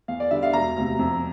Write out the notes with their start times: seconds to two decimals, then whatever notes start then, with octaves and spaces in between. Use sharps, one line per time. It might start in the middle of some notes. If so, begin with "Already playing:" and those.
0.08 E2 F5
0.20 D5
0.31 D3 G3 E5
0.42 F5
0.53 E1 A#5
0.76 D2 C3
0.99 F2